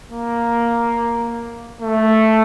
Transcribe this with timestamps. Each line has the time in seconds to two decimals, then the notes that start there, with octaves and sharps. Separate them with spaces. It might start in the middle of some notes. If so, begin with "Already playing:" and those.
0.11 A#3
1.82 A3